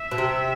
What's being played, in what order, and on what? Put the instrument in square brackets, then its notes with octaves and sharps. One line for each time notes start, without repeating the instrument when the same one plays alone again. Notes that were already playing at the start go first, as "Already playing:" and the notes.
Already playing: [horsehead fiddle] E5
[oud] B2
C3